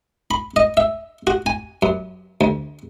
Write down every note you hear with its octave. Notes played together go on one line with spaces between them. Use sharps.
B5
D#5
E5
F#4
G#5
F#2
D2